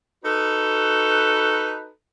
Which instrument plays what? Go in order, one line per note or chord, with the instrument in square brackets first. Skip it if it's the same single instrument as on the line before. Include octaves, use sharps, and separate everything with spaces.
[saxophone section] D#4 F#4 A4 B4